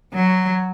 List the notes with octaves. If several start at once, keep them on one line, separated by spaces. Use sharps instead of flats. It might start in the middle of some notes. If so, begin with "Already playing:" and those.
F#3